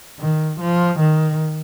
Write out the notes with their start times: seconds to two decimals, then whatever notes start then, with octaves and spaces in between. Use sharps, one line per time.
0.20 D#3
0.61 F3
1.00 D#3